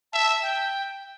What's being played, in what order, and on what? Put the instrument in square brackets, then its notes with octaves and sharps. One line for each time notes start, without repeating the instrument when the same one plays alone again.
[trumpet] E5 [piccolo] A5
[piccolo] G5